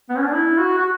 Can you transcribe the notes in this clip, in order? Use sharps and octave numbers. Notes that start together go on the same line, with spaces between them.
B3
C#4
D4
E4
F#4
F#4